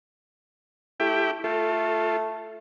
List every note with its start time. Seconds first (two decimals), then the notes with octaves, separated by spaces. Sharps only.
1.00 A3 E4 G4 G5
1.44 A3 F4 A4